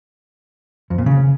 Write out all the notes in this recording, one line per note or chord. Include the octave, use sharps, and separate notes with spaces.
F2
A#2
C#3